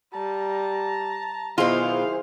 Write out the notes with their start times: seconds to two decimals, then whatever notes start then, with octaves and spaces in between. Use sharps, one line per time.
0.14 G3 A5 A#5
1.58 B2 D#3 F#3 E4 F4 G#4 C5 F5